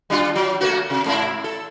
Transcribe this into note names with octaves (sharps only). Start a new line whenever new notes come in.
G3 D4 F4
F#3
A3 A#3 F#4
C3
G#2 E4
A4